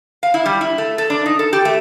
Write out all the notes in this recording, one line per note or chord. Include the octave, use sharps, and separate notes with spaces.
F5
E4
G3
E4
A3
A4
D4
D#4
A4
G4
A3